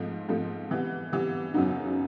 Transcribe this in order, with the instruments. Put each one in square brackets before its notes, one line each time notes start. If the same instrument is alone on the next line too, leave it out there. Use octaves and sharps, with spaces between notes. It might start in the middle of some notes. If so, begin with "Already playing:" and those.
Already playing: [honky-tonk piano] G#2 F3 A3 C4
G#2 F3 A3 C4
C3 E3 G3 B3
C3 E3 G3 B3
F#2 C#3 F#3 B3 D#4